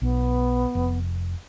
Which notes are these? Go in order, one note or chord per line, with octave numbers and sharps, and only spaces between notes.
B1 B3
F1